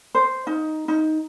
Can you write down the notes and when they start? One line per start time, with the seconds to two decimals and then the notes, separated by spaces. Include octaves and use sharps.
0.15 C5
0.47 D#4
0.88 D#4